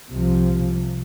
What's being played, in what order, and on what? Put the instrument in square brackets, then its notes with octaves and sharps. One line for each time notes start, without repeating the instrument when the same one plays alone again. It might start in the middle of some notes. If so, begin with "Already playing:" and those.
[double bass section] C2 C3 F3